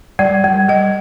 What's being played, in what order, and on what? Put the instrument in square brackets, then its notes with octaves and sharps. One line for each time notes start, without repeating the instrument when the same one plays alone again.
[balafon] G3 D5
G3
G3 D#5